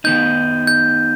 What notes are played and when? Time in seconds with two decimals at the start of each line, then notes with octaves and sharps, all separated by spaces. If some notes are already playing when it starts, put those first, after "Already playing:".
0.04 D#3 B3 D#4 G6
0.67 G6